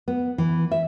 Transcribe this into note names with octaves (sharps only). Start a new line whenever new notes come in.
B3
E3
E5